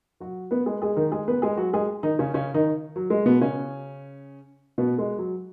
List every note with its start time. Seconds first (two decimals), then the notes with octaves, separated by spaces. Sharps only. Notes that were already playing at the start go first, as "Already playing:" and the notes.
0.20 F#3 F#4
0.51 B3 B4
0.66 G#3 G#4
0.82 G#3 G#4
0.96 D#3 D#4
1.12 G#3 G#4
1.28 B3 B4
1.42 G#3 G#4
1.57 F#3 F#4
1.73 G#3 G#4
2.03 D#3 D#4
2.19 C#3 C#4
2.34 C#3 C#4
2.54 D#3 D#4
2.96 F#3
3.10 G#3
3.26 B2 B3
3.41 C#3 C#4
4.78 B2 B3
4.98 G#3
5.18 F#3